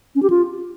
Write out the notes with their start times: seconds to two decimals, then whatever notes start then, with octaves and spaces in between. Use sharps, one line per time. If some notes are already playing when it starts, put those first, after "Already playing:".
0.15 C#4
0.23 G4
0.30 F4